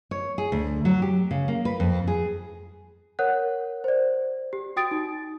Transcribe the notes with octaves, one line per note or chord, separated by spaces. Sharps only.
C#5
G#4
D2
F#3
G4
C#3
A#3
B4
F2
G#4
A#4 C#5 F#5 F#6
C5 D5
G4
F#4 G5 D#6 A6 D7
D#4